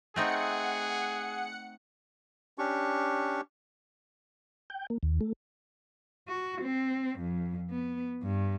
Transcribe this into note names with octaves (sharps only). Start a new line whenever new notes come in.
A3 C4 D#4 G#4 F#5 C#7
C#4 D4 G4 C#6
G5
A#3
D#2
A3
F#4
C4
F2
B3
G2